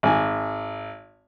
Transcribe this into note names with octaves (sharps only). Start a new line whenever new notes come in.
G#1 G#5